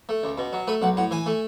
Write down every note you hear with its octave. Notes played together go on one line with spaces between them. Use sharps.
A3
C#2
B2
F#3
A3 B4
B1 F#5
A2 F#5
E3 G#5
A3